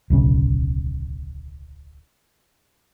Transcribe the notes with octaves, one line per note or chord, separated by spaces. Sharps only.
D1 B1 C#3